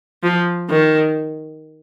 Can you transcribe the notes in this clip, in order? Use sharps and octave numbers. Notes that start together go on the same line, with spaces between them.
F3
D#3